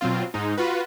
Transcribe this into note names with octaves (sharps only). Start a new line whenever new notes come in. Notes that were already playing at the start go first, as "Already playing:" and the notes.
B2 F#3 C4 F4
G#2 G#3 D#4
F4 F#4 B4